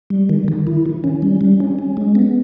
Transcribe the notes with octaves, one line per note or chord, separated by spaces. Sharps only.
G3
D#3
D#3
E4
D#3
C#4
G3
G3
C#4
C#4
G#3
B3